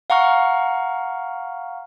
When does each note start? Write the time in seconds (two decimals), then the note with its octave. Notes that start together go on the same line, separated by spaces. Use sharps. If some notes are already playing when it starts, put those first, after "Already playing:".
0.10 F5 F#5 A#5 C#6 F6